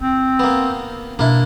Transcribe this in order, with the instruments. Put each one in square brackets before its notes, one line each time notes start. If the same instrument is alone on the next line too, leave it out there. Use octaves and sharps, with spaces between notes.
[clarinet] C4 [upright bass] E4
[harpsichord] A#3 B3
[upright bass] B2 [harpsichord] A#3 E4 [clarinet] D4